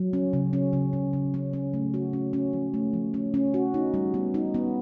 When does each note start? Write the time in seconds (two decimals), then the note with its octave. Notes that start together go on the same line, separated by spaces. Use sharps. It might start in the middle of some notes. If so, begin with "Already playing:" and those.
Already playing: F#3
0.13 C#4
0.33 C#3
0.53 C#4
0.73 C#3
0.93 C#3
1.13 C#3
1.34 C#4
1.53 C#4
1.74 A3
1.94 F#4
2.13 C#4
2.33 C#4
2.53 F3
2.74 A3
2.93 F3
3.14 C#4
3.34 C#4
3.54 F#4
3.74 D#4
3.94 G3
4.14 B3
4.34 D#4
4.54 B3